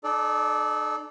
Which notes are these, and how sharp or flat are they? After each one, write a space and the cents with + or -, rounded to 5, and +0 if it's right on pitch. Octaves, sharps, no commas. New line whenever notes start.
D#4 -45 A4 -30 D5 +0